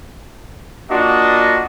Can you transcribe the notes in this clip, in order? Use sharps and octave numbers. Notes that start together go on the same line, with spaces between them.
A#3 D4 F4 F#4 D#5